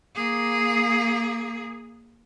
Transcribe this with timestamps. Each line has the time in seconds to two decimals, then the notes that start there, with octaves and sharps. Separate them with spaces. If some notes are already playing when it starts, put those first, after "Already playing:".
0.15 A#3 G#4